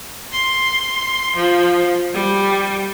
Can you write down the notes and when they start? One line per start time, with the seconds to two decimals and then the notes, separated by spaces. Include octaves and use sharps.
0.32 C6
1.36 F3
2.14 G3